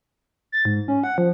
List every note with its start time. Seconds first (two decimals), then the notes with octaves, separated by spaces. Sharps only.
0.52 A6
0.65 G#2
0.88 C#4
1.04 F#5
1.18 F3